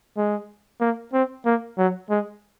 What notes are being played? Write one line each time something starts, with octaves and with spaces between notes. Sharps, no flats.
G#3
A#3
C4
A#3
F#3
G#3